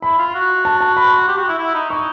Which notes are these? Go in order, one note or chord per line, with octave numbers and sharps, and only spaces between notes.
E4 B5
F4
F#4
A5
A5
B5
C6
G4
F#4
E4
E4
D#4
D#4 C#6